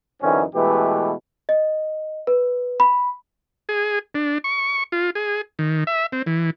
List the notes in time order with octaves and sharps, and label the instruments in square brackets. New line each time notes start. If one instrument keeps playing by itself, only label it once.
[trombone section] F#2 D3 E3 C4 C#4 D#4
B2 E3 G#3 A3 G4 B4
[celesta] D#5
B4
B5
[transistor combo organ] G#4
D4
C#6
F4
G#4
D#3
E5
C4
E3